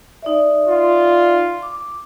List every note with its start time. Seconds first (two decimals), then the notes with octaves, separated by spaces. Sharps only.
0.22 D#4 D5 E5
0.67 F4
1.62 D6